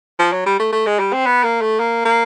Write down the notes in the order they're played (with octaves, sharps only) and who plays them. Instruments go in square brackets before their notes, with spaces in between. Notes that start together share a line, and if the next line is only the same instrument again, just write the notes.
[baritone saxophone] F3
F#3
G3
A3
A3
G#3
G3
C4
B3
A#3
A3
A#3
A#3